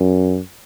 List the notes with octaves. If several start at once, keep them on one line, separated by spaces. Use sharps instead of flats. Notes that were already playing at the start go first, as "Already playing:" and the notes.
Already playing: F#2